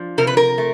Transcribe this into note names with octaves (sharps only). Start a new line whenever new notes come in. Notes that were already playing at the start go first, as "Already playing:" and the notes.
Already playing: F3 D4
C3 A#4
B4
A#4
A3